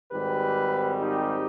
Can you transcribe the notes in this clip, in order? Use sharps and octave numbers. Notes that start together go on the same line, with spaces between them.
G#1 G#2 D#3 G3 C4 G4 B4
D#4 G4